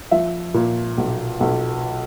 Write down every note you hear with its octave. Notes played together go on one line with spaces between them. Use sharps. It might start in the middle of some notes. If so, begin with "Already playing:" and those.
F3 E5
A#2
B1
B1